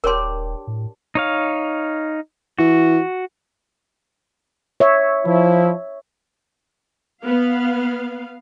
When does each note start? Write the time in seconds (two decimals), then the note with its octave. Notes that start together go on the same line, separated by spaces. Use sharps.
0.04 D#1 D4 G4 A#4 C#5 C6
0.67 A2
1.15 D#4 C#5 F5
2.59 E3 F#4
4.80 C#5 E5
5.26 F3 E4
7.22 B3 F5